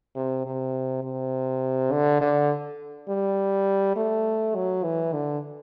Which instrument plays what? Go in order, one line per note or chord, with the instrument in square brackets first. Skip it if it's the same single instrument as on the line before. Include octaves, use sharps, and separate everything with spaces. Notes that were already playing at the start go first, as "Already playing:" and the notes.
[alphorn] C3
C3
C3
D3
D3
G3
A3
F#3
E3
D3